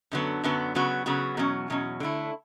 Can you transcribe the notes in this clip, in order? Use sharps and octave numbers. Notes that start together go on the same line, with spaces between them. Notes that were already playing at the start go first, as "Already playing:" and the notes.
F#2 D3 F#3 B3
F#2 D3 F#3 B3
C#3 F#3 B3 F#4
C#3 F#3 B3 F#4
E2 B2 F#3 C#4
E2 B2 F#3 C#4
D3 A3 E4